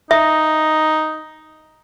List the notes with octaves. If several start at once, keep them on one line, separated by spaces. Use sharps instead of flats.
D#4 E5